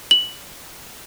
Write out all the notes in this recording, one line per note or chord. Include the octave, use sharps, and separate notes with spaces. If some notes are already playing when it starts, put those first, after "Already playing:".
F#7